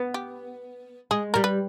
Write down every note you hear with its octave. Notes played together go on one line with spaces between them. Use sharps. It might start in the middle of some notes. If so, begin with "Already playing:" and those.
Already playing: B3
G4
G#3 G#4
G3 A#4
B4